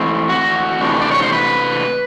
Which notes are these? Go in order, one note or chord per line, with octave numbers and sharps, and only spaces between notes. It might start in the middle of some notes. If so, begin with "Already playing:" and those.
Already playing: E3 A3 C4
F#4
C3 E3 A3 D4
D5
C#5
C5
B4